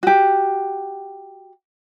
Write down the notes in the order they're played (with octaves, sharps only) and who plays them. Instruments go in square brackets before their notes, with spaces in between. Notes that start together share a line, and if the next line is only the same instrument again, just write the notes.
[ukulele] F#4 G4